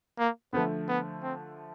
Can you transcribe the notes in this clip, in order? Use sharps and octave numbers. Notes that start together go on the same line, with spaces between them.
A#3
D3 F3 A3 B3
B3
C4